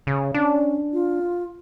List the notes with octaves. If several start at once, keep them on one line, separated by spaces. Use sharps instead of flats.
C#3
C#4 D4
F4